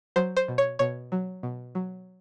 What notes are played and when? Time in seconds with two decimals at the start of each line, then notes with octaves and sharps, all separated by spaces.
0.16 F#3 C5
0.37 C5
0.48 B2
0.58 C#5
0.79 B2 C#5
1.12 F#3
1.43 B2
1.75 F#3